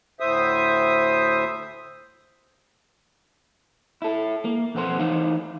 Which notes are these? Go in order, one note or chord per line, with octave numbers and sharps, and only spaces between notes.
D2 A2 C5 E5 D#6
E4 A4
A#3
B1 F2 B3 C4 A4 C6
E3 D#4 C5 F5